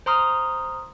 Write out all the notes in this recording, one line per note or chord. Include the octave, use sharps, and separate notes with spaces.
C5 A#5 C6 D#6 F6